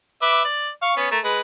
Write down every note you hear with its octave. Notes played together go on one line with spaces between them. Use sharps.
B4 E5 D6
D5
F5 C#6
B3 C#4
A3 A#4
G#3 B4